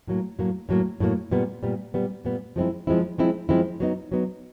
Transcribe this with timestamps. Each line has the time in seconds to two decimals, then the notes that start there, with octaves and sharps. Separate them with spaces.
0.07 A2 F#3 A#3
0.39 A2 F#3 A#3
0.69 A2 F#3 A#3
1.00 A2 F#3 A#3
1.31 A#2 G3 B3
1.63 A#2 G3 B3
1.94 A#2 G3 B3
2.25 A#2 G3 B3
2.56 F3 G#3 C4 E4
2.87 F3 G#3 C4 E4
3.18 F3 G#3 C4 E4
3.49 F3 G#3 C4 E4
3.80 F#3 B3 D#4
4.12 F#3 B3 D#4